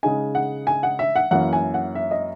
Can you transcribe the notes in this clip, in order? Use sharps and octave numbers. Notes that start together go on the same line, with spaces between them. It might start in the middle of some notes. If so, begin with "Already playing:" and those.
C#3 G#3 D#4 G#5
F#5
G#5
F#5
E5
F#5
F#2 E3 A#3 F#5
G#5
F#5
E5
D#5